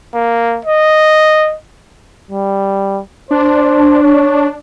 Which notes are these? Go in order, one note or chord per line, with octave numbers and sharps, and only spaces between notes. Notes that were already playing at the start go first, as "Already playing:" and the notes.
A#3
D#5
G3
D4 C5
C#5